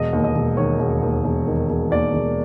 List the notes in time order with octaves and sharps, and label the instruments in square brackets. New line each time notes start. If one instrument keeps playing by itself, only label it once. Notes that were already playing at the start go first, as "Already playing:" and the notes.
Already playing: [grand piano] E1 D#5
D#2
D#5
E1
D#3 C#5
E1
D#2
E1
D#3
E1
D#2 D5
E1